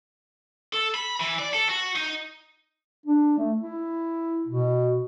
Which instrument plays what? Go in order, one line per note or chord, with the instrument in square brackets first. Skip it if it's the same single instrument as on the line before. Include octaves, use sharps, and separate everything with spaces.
[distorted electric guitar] A4
B5
E3
D5
A4
F#4
D#4
[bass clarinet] D4
A3
E4
B2